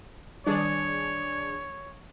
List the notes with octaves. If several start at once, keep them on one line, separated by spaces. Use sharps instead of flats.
D#3 G3 D4 G#4 C#5 D5